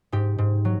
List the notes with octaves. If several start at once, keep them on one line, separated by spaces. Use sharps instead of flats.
G#2 G4
G#2
F#3